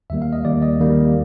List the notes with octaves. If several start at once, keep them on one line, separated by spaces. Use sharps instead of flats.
D#2 D#3 G3 A#3 E5
F5
D#5
D#2 D#3 G3 A#3 D5
D#5
D#2 D#3 G3 A#3